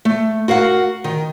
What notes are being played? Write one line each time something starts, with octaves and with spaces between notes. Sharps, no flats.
A3
F#4 A#4 F5 F#5
D#3